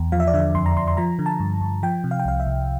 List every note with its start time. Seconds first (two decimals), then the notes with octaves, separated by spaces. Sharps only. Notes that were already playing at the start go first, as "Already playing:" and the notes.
Already playing: E2
0.12 F3 F5
0.20 E5
0.27 D5
0.34 D3 E5
0.55 F2 C6
0.66 A#5
0.76 F2 C6
0.88 C6
0.97 F3 A#5
1.19 D3
1.26 A5
1.40 G2
1.61 G2
1.83 F3 G5
2.04 C3
2.11 F5
2.20 G5
2.25 C2 F5
2.40 E5
2.47 C2